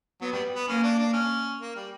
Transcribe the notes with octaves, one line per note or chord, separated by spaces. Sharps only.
F#3 B3
G3
B3
A#3 C#4
D4
D4
C#4
A#3
G3